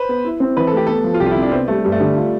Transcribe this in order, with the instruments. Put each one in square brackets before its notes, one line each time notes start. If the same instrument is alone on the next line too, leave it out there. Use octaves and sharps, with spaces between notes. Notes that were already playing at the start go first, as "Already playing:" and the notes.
Already playing: [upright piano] B4 C5
[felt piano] B3
E4
C4
[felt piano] E3 [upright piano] B4
[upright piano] A4
[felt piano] A3 [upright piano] G4
[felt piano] B3 [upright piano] A4
[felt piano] F3
[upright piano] F4
[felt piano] C2 [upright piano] G4
[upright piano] F4
E4
[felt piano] C3
[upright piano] D4
[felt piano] B3 [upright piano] C4
[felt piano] G3 [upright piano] A3
[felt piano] G2 [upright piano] G3
[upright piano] A3
[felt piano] D3 [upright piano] G3
[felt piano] F4